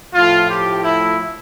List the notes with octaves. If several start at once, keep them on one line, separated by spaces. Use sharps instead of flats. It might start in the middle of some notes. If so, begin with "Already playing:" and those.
A2 F3 F4
G4
E4